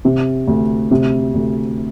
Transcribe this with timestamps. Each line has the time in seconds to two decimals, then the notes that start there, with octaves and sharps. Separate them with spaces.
0.05 C3
0.48 D2
0.91 C3
1.34 D2